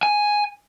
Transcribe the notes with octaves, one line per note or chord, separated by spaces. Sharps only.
G#5